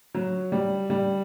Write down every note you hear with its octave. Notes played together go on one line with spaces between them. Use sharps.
F#3
G3
G3